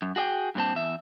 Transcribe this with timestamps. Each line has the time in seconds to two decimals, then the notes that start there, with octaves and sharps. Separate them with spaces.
0.02 F#2
0.16 F#4 G#4 D#5 G5
0.55 G2 A#2 C4 A5
0.75 E2 E5